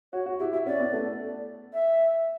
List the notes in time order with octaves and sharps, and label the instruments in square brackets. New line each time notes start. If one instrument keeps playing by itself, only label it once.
[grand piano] F#4 [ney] C#5
[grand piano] F#4
[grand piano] E4 [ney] G4
[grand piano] E4 [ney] E5
[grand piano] C#4 [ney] D5
[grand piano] B3
A3
[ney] E5